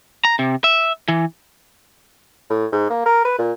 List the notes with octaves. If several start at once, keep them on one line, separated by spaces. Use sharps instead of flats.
A#5
C3
E5
E3
A2
G#2
A#3
A#4
B4
A#2